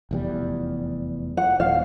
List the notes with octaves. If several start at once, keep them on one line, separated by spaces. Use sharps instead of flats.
F1 E2 G3
F#5
D#1 F5